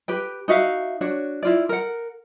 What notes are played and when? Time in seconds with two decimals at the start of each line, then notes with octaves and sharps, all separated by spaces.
0.08 G4 B4 G5
0.48 D#4 F#4 E5 F5
1.01 D4 F#4 C#5
1.43 E4 F4 D5
1.69 A#4 F#5